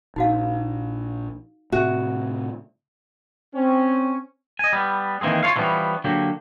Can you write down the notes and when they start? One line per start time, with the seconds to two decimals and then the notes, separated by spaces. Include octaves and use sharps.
0.16 A#1 D#4 F#4 F5
1.72 A2 C3 F#4 E5
3.54 C4 C#4
4.59 D#5 G#5
4.73 G3 B3
5.21 D#3 E3 A#3 C4 G#4
5.43 F4 A4 C#5 F5
5.56 D3 E3 F3 G3 B3 C#4
6.04 D3 F#3 A#3 G4